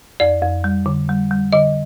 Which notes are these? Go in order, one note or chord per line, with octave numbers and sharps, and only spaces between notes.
F2 D5
F2
G3
D3
G3
G3
D3 D#5